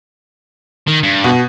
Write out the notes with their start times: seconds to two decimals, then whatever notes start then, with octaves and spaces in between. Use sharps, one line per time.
0.87 D#3
1.03 G2
1.24 B2